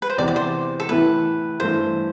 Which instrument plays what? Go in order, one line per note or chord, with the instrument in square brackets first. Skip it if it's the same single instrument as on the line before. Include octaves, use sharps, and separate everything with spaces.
[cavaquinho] B4
C5
[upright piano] E2 C3 E3 [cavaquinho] D5
[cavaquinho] D5
C5
A4
[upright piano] A2 E3 A3 E4 [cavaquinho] B4
[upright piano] G2 E3 A3 [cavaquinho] C5